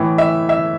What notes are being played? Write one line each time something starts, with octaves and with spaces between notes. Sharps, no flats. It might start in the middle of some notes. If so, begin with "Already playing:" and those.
Already playing: A2 E3
E5
E5